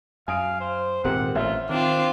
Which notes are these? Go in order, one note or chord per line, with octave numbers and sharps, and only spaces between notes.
F#2 F5 G#5 D#6 D7
C5
D#1 G#2 C4 G4 A#4 F#5
A1 F4 C5 E5
D#3 C4 D4 F4